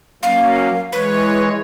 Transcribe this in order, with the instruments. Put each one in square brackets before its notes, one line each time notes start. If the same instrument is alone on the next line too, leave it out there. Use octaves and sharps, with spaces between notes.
[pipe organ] F#3 A#3 C#4 [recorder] F5
[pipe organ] E3 G#3 C#5 [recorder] B4